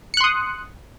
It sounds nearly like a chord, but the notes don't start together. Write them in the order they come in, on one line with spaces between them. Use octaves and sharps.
C#7 F#6 C6 D#6